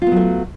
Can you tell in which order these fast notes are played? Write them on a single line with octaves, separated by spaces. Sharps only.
F4 B3 F#3 A3